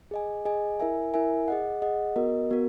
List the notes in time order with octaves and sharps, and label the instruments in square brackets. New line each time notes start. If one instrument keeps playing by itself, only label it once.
[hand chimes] G#4 D#5 G#5
G#4 D#5 G#5
E4 A#4 E5 G#5
E4 A#4 E5 G#5
G#4 D#5 F#5
G#4 D#5 F#5
B3 F#4 A#4 D#5
B3 F#4 A#4